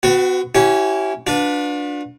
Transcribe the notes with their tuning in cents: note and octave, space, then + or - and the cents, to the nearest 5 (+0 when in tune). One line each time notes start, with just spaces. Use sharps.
C4 -45 F#4 +0 B4 +25
C#4 +0 E4 +0 G4 -35
D4 -5 F4 +45 B4 +0